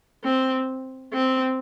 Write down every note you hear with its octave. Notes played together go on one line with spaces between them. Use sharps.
C4
C4